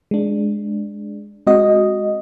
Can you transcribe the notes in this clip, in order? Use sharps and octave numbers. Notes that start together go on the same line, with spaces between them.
G#3 D4
G#3 C4 F#4 D#5